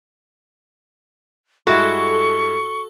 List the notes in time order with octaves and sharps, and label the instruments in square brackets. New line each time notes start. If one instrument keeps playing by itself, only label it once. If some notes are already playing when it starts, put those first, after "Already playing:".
[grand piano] G2 G#3 E4 [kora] F#4 [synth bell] A4 [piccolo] C#6